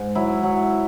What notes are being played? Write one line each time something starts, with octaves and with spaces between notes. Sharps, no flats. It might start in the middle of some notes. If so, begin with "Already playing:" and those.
Already playing: G#2
F#3 E4
F#3